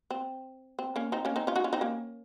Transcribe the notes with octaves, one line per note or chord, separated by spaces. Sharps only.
C4
C4
A#3 C#4
C4 D#4
A#3 C#4
C4 D#4
C#4 F4
D#4 F#4
C#4 F4
C4 D#4
A#3 C#4